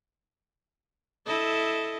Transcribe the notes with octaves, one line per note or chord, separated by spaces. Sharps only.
E4 A4 D#5